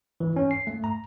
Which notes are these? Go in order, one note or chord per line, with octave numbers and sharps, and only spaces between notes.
E3
C#4
C7
A3
A#5